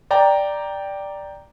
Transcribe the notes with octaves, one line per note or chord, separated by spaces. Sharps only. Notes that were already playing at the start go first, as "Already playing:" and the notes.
D5 G5 A#5